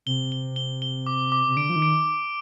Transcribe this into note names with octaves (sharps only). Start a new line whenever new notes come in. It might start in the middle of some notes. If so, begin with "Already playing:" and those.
C3 G7
G7
G7
G7
D6
D6
C3
D3 D7
F3
D#3
D7